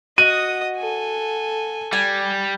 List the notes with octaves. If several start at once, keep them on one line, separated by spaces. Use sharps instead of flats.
F#4 D#5 D#6 D#7
A4 G#5
G3 G#5